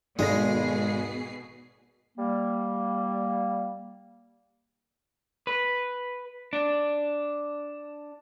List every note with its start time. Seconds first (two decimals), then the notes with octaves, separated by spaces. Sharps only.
0.19 G#1 B2 G#3 G#4 A4 A#6 C7
2.18 G3 A#3
5.47 B4
6.53 D4